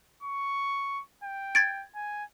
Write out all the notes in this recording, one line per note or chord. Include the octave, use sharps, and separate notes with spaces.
C#6
G5
G#6 A6 D7
G#5